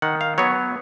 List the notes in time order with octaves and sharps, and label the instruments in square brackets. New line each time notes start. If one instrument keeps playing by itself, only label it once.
[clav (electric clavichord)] D#3 F#5
F5
F#3 B3 C#5